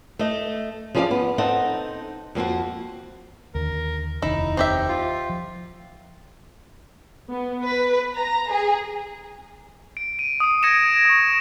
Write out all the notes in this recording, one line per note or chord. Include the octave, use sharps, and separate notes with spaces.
A3 D#5
F3 C#4 G#4 B4 D5 F5
B3
C4 D#4 A4 D#5 F#5
F2 A#3 C4 F#4
D#2 D3 A#4
F1 D#2 D#4 E4
C4 G4 E5
F4
F3
B3
B4
A#5
G#4
D7
D#7
D#6 D7
D#6 G#6 A#6 C#7 D7 E7
C#6 D#6